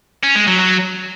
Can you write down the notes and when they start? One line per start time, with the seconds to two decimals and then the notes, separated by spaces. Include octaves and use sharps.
0.23 C#4
0.35 G#3
0.47 F#3
0.59 F#3